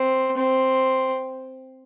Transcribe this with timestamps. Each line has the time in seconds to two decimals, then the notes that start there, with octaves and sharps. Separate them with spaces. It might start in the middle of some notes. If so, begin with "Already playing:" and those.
Already playing: C4
0.37 C4